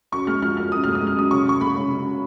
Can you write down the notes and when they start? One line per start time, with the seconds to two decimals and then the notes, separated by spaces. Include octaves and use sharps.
0.12 F#2 C#6
0.27 G#3 F6
0.42 F3 F6
0.57 F#2 F6
0.72 F#2 D#6
0.84 G#3 F6
0.95 D#6
1.02 G#3
1.07 F6
1.17 F#2 D#6
1.31 C#3 C#6
1.46 C#3 C#6
1.61 G#3 B5
1.76 C#3
1.90 C#3